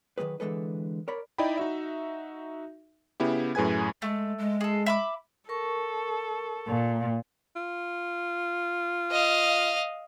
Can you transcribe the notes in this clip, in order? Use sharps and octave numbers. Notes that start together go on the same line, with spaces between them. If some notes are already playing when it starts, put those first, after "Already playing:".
D#3 E3 F#3 G#4 B4
D3 E3 G#3 A4 B4
A#4 C#5 D5 B5
D#4 E4 D5 D#5 G5 B5
D#4 F#4 E5
C#3 B3 E4 G4
F#2 A2 G#4 B4 G#5 G#6
G#3 A3
G#3
G#4 A4
E5 B5 D6
A4 A#4 C#6
A#2
F4
D#5 F5